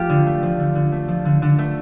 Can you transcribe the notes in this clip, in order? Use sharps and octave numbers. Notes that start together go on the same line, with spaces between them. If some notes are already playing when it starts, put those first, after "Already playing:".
Already playing: F3 A3 F4 G4
D3
A3
F3
D3
D3
A3
F3
D3
D3
A3